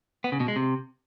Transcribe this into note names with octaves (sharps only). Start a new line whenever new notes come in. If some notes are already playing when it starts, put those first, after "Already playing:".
B3
C#3
B2
G#3
C3